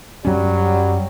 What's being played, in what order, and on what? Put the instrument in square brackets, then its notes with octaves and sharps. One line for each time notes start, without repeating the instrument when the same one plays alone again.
[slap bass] F#2 C#4 [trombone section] F#3 G3